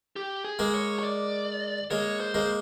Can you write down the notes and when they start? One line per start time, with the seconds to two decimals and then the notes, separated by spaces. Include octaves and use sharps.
0.16 G4
0.45 G#4
0.59 G#3 A#3
0.74 C#5
0.99 C#5
1.04 D5
1.91 G#3 A#3 C#5
2.20 C5
2.34 G#3 A#3 C5